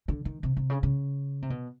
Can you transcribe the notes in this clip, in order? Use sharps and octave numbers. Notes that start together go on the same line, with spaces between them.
D3
D#3
C3
C3
C#3
C#3
C3
B2